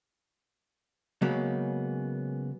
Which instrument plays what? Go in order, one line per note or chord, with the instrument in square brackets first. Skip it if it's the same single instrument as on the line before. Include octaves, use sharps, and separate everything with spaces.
[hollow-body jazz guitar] C#3 F#3 G#3 A#3 B3 C#4